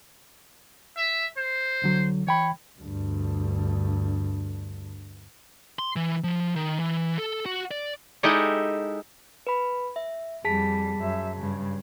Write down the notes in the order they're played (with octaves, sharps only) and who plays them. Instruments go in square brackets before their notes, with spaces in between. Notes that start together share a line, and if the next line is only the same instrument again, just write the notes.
[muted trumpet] E5
C5
[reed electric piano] C2 D3 F#3
[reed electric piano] E3 G5 B5 [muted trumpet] C#5
[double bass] D2 G2
[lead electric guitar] C6
E3
F3
D#3
E3
A4
F#4
D5
[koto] G#3 D#4 E4 G4 A4
[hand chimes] B4 B5
E5
[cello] F2 G3 [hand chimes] G#4 A5 B6
[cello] F#2 E5
G2 C#3